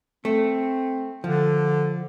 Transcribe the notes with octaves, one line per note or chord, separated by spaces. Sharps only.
A3 C4
D3 F3